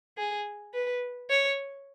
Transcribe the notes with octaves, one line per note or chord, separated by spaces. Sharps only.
G#4
B4
C#5